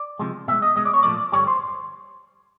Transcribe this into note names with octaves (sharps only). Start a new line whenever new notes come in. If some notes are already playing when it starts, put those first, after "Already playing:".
Already playing: D5
C3 F3 G#3
B2 G#3 E5
D#5
B2 G#3 D#5
D5
C#5
A#2 F3 A3 D5
G2 D3 G3 C#5
C5